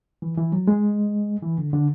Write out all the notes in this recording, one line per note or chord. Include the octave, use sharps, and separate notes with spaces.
E3
E3
F#3
G#3
E3
D3
D3